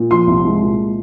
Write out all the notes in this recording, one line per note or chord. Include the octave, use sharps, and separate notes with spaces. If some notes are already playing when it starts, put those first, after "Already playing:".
Already playing: A#2
F3 C6
C2
G#3
A#2